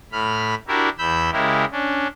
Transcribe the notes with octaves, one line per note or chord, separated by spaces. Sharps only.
A2 B5 F6
D4 E4 F#4 G4 A#4
E2 B5 E6 G6
C#3 G#3 E4 G4 A#4
C#4 D4